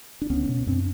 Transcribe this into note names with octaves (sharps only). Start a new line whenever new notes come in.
D4
C#2 B3 C#4
B2
F#2 C4 D4